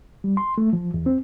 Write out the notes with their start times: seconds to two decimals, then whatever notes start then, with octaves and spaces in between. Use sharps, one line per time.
0.24 G3
0.37 C6
0.58 A3
0.73 F3
0.94 E2
1.06 C4